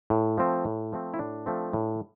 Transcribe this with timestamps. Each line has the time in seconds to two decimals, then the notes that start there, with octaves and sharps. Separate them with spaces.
0.10 A2
0.38 F3 A3 C4
0.65 A2
0.92 F3 A3 C4
1.14 E4
1.19 A2 D4
1.46 F3 A3 C4
1.73 A2